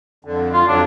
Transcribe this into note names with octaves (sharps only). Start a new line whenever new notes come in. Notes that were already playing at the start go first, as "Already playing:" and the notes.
F2 D3
F4
F2 F#3 D4